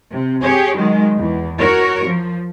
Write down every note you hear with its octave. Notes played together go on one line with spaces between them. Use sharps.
C3
G4 G#4 C#5
D#3 F#3 G#3
E2
F#4 A#4 C#5
F3